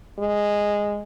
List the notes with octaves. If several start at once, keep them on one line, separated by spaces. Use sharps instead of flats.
G#3